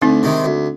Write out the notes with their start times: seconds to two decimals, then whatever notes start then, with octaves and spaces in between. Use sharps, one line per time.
0.02 D2 C4 D#4
0.23 C3 D#3 G#3
0.44 D2